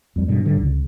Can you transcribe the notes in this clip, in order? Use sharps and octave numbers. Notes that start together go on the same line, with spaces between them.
F2 G3
G2 B2 G3
G#2 D3 G3
C#2 C#3